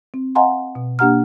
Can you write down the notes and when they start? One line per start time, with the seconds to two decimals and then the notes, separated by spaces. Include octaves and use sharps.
0.14 C4
0.35 D#5 F5 F#5 G#5 A#5 C6
0.75 B2
0.99 A#3 D4 G4 F#5 A#5 F6